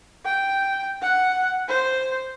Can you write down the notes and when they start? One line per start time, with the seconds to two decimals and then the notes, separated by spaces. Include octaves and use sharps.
0.25 G5
1.02 F#5
1.68 C5